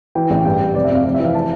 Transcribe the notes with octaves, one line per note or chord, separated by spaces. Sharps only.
E3 G5
A1 G5
G2 G5
G2
F1 D5
E5
F2 F5
F1 D5
E5
E3 F5
A5